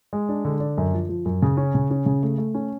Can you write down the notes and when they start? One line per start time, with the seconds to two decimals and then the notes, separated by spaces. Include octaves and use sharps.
0.13 G#3
0.29 D4
0.45 D3
0.60 D4
0.78 F#2
0.94 F3
1.09 F3
1.25 F#2
1.42 C#3
1.57 C#4
1.75 C#3
1.91 C#4
2.06 C#3
2.23 A3
2.38 A3
2.55 C#4